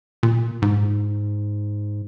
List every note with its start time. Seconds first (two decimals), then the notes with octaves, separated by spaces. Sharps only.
0.23 A#2
0.62 G#2